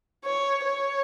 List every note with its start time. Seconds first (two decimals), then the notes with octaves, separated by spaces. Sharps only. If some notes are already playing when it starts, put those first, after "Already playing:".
0.25 C#5
0.64 C#5